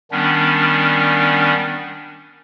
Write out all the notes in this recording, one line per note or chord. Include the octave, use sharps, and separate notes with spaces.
D#3 G3 B3 C#4 D4